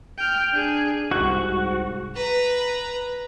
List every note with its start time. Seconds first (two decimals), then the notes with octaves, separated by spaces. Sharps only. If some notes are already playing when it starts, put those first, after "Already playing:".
0.18 G5 F6
0.52 D4 G#4
1.11 C2 G#2 F#4 F#6
2.16 B4 A#5